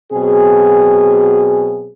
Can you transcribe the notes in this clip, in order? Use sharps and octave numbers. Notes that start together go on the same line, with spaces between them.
B2 F#3 C4 G#4